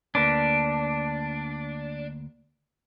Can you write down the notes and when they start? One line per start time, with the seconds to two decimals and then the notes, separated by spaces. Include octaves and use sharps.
0.15 D2 A#3 D4 B4